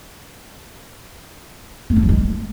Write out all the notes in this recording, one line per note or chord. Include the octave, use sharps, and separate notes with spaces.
A3
D4
F3
G#3